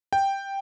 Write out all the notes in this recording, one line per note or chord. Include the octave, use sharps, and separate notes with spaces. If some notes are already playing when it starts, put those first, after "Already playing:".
G5